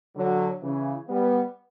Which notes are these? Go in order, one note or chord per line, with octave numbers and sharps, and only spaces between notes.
D3 F#3
C#3 E3
G3 B3